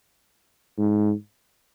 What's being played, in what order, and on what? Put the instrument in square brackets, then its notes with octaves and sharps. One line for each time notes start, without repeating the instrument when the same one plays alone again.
[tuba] G#2